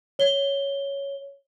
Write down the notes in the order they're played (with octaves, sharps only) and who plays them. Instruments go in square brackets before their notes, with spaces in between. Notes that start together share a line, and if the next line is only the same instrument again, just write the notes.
[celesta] C#5 G7